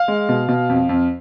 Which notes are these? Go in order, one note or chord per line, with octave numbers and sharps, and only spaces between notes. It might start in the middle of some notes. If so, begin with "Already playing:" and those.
Already playing: F5
G#3
B2
B2
F2
F2